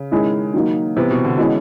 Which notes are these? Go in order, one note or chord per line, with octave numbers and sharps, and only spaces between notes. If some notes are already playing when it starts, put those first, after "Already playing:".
Already playing: C#3
D#3 G#3 C#4 E4
D#3 F#3 A#3 D#4
C3 E3 G3 B3
B2
D3
B2 E3 G#3 C#4 E4